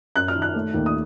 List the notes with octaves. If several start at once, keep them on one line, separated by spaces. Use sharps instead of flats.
F#2 F#6
F6
D#3
F#6
A3
D#2
D#6